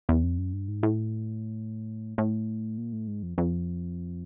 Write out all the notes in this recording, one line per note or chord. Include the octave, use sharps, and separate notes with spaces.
E2
F2
F#2
G2
G#2
A2
A2
A#2
A2
G#2
F2
F2